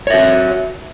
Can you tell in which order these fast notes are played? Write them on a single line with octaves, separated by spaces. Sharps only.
C#5 E5 F#4